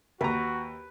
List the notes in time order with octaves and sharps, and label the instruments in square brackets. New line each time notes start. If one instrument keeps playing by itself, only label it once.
[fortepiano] D#2 A#5 [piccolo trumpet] F#4 [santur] B4